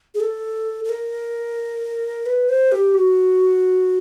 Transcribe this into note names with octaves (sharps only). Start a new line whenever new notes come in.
G#4
A4
A4
A#4
B4
C5
G4
F#4